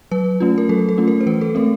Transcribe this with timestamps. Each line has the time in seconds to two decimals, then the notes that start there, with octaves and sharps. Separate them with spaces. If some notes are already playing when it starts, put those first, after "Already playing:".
0.11 F#3 B4
0.40 A3 C#4 F4
0.58 A#4
0.69 F#3 A4
0.89 A4
0.98 A3 C#4 F4
1.08 A#4
1.21 C5
1.26 E3 B4
1.41 A4
1.55 A3 C4 A#4